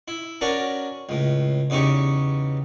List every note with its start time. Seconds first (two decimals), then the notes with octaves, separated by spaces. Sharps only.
0.08 E4
0.41 C#4 D4 F#4 A#4 D5
1.09 C#2 A2
1.70 E2 C#3 D#4 G4 C#6